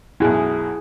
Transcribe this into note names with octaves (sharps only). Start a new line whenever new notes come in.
B1 F#2 E4 G#4